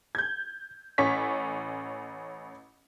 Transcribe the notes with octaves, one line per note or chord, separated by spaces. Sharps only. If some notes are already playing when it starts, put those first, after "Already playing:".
G6 G#6
A1 C#4 C#6 B6